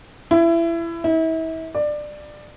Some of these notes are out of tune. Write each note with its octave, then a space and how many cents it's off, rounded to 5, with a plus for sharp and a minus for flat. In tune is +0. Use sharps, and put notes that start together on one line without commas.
E4 +25
E4 -35
D5 +20